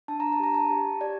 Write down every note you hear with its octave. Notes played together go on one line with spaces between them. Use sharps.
D4 A5
A#5
A5
G4 A#5
A5
G4
G4 D5